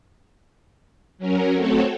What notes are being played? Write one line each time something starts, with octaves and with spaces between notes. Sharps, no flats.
F#3 C#4 A#4
A3 C4 F#4 A4 C#5